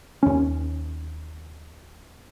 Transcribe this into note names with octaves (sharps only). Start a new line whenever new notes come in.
D#2 C#4